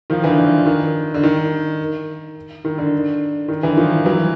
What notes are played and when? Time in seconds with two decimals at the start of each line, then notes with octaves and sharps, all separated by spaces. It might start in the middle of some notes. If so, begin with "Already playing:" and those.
0.10 D#3 F3
0.24 D3 E3
0.38 D3
0.66 D#3
1.14 D3
1.24 D#3
2.65 D#3
2.78 D3
3.48 D#3
3.63 D3 E3
3.77 D#3 F3
4.05 E3 F#3